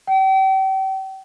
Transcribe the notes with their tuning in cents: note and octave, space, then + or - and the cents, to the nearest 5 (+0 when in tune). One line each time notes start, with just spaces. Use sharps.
G5 -40